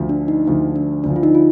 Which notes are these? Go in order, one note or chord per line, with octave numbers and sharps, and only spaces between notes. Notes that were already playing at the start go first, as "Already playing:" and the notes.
Already playing: D2 D3 F3
D4
D#4
D2 D3 F3 D4
D4
D2 D3 F3 D4
F4
D#4
F4